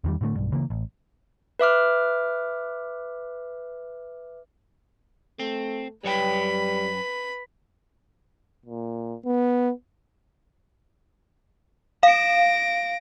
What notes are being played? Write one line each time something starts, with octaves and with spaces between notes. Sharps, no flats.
E2 D#3 G3
A2 D3 F3 A3
B1 G2
C#3 E3 A#3
A1
B4 E5 D6 F6
A3 C4
F#2 G3 B4 C#5 G5 B5
A#2
B3
F5 A#6 D7